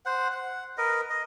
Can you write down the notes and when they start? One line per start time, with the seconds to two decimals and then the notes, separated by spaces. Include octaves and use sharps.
0.06 C5 F#5
0.32 F#5
0.78 A#4 B4 D#5
1.10 D#5